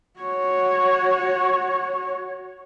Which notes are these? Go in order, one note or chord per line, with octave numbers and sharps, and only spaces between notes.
F#4 C#5